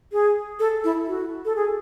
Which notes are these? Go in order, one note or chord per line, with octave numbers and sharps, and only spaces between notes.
G#4
A4
E4
F#4
A4
G#4